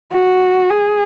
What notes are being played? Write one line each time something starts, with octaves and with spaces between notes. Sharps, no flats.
F#4
G#4